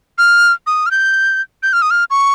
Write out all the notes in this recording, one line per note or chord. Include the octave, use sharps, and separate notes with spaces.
F6
D#6
F6
G6
G6
F6
D#6
F6
C#6